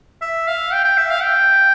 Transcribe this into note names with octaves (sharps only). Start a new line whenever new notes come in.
E5
F5
G5
G5
E5
F5
G5